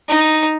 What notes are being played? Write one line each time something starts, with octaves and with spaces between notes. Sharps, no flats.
D#4